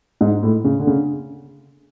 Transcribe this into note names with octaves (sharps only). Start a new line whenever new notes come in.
G#2
A2
C#3
D3
C#3